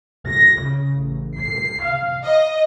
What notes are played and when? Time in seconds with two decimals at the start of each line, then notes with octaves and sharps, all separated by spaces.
0.28 A#6
0.60 C#3
0.92 A1
1.37 C7
1.83 F5
2.24 D#5